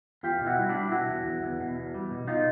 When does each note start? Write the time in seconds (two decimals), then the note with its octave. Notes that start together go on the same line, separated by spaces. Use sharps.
0.23 E2 F4 G4
0.41 B2
0.46 E4 F#4
0.58 G3
0.69 D4 E4
0.75 G3
0.91 B2 E4 F#4
1.09 E2
1.26 E2
1.43 E2
1.60 B2
1.77 E2
1.94 G3
2.11 B2
2.27 B2 D#4 F4